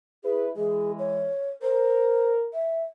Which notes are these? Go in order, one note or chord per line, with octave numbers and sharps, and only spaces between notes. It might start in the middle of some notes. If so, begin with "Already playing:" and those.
E4 G#4 B4
E3 G#3 G#4
C#5
A#4 C5
E5